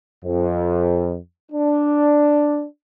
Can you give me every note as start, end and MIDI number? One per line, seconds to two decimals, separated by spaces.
0.25 1.15 41
1.51 2.64 62